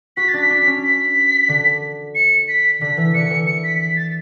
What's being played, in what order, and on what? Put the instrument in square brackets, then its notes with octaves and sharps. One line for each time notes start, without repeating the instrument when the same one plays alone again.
[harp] F#4 [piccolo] B6
[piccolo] A6
[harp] D4
[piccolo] B6
[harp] D4
C#4
[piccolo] B6
[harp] D3
[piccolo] C#7
B6
[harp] D3 [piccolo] B6
[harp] E3
[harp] D3 [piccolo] C#7
[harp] E3
[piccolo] C#7
B6
B6
A6